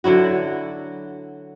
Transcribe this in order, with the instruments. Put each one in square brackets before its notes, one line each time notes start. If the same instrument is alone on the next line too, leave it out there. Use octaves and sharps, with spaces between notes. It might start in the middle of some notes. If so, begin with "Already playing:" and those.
[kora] D3 F#3 E4 F#4